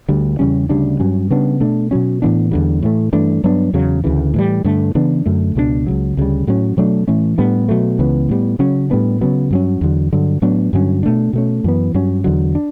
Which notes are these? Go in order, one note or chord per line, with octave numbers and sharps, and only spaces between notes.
D2 D3 G3
E2 C#3 G3 C#4
D2 C#3 G3 D4
G2 F#3 C#4
C#3 G3 B3 D4
B2 A3 D4
B2 F#3 C#4
A2 E3 B3 D4
E2 D3 G3
A2 E3 A3
G2 E3 A3 D4
G2 F#3 B3 D4
E2 C#3 F#3
D2 C#3 E3
A2 E3 G3
G2 D3 A3
C#3 E3 B3 D4
F#2 D3 A3
C#2 B2 G3 D4
C#2 C#3 F#3
D2 C#3 G3
A2 F#3 C#4
B2 F#3 A3 D4
A2 E3 A3 C#4
A2 G3 B3 D4
B2 F#3 A3
C#2 C#3 E3 B3
A2 G3 B3
C#3 F#3 C#4
A2 G3 B3 D4
C#3 F#3 B3
G2 F#3 C#4
E2 D3 F#3
G2 D3 F#3
A2 F#3 B3 D4
G2 D3 F#3 C#4
B2 A3 D4
B2 A3 C#4
F#2 E3 B3
G2 F#3 C#4
E2 D3 F#3
D4